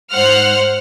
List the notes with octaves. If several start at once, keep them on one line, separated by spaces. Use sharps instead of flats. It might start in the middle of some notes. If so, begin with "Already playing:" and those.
G#2 C5 F#5 F6